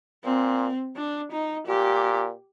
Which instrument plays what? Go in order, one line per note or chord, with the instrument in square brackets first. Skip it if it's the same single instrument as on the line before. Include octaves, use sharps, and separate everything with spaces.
[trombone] A#2 [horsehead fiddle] C4
[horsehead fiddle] D4
D#4
[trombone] A#2 [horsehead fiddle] G4